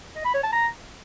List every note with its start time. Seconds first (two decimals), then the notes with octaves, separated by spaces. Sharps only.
0.16 D#5
0.25 B5
0.34 C#5
0.43 A5
0.53 A#5